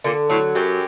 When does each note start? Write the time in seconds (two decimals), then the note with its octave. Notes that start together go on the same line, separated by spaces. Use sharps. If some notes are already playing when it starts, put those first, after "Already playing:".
0.04 A#2 D3
0.30 A2 F#3
0.55 F#2 G4